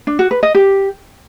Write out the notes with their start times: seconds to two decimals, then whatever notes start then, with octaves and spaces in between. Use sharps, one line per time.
0.07 D4
0.19 F#4
0.31 B4
0.43 D#5
0.55 G4